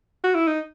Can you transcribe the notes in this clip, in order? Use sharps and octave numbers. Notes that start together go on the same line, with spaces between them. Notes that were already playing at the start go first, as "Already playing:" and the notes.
F#4
E4
D#4